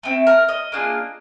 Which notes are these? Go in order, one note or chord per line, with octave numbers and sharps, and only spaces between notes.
A3 C4 E4
A#4
D#5
A#3 D4 F4 G#4